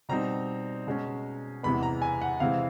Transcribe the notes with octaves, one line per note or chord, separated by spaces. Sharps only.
B2 G3 C4 D#4 A#5
B2 G#3 C#4
E2 C3 E3 G#3 B3 B5
A#5
G#5
F#5
C3 E3 G#3 C4 F5